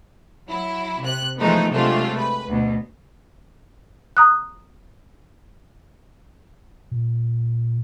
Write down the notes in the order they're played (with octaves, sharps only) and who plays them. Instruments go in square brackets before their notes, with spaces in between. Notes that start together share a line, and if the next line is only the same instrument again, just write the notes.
[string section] F#3 E4
C3 F#6
E3 F3 G#3 A3 B3 D#4
C3 F#3 G#3 A3 D4 F4
B4
D2 B2
[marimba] A#5 D#6 F#6
[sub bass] A#2